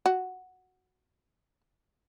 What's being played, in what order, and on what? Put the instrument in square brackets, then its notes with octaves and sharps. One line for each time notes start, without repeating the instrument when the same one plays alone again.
[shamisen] F#4